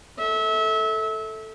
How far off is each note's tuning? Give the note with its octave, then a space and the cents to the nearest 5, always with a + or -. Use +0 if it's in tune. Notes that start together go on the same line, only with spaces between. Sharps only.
A4 +0 E5 -25